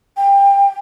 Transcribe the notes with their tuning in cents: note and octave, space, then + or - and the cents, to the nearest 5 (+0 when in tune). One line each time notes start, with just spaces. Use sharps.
G5 +25